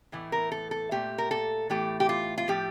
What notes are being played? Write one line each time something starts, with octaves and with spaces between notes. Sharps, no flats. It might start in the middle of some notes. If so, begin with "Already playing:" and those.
A2 E3 A3
A#4
A4
A4
A#2 A3 G4
A#4
A4
A2 E3 A3 G4
G4
F4
F4
A2 F3 A3 G4